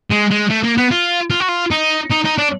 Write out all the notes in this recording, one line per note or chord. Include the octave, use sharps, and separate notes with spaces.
G#3
G#3
A3
A#3
B3
F4
F4
F#4
F4
D#4
D#4
D#4
D4